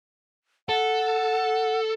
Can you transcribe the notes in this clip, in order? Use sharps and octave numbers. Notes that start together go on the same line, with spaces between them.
A4 F#5